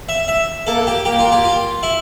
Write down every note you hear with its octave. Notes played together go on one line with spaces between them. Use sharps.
E5
E5
A#3 A4
G4
A#3 G4
F4
G4
F4
E4